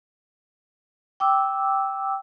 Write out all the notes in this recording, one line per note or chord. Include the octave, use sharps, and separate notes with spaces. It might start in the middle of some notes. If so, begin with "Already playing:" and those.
G5 D6 E6